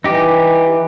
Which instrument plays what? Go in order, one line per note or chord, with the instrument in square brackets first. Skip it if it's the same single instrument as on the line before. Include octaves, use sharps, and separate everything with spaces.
[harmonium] E3 [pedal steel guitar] D#4 G4